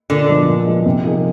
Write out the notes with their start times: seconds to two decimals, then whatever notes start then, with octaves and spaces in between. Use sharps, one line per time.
0.10 A#2 D3
0.29 F3 G#3 B3 D4
0.48 A#2
0.67 F3 G#3 B3 D4
0.86 C3
1.04 F3 A#3 D#4 G#4